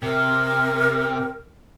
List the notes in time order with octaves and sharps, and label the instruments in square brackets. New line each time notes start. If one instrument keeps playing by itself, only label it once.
[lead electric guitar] C3 [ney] A#4